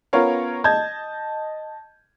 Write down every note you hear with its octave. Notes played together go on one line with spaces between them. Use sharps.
B3 C#4 F4 A#4 C#5 F5
D#5 A5 G6 G#6